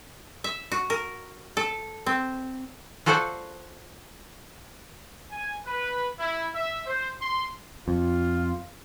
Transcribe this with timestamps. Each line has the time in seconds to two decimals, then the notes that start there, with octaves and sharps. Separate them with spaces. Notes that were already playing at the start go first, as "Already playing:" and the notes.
0.44 E5
0.72 F#4
0.90 A#4
1.57 A4
2.06 C4
3.06 F4 F#4 A4 C5 D5 F#5
5.31 G#5
5.66 B4
6.19 E4
6.54 E5
6.86 C5
7.21 C6
7.88 F2 F4